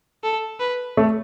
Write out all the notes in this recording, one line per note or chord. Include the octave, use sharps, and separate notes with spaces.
A4
B4
A3